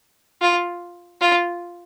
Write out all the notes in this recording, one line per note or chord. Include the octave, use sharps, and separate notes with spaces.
F4
F4